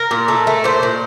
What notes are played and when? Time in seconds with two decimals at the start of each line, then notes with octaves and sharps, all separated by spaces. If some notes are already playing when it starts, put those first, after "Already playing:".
Already playing: A#4
0.11 A#2
0.28 A3
0.47 A3
0.64 A#2 C5
0.83 A#2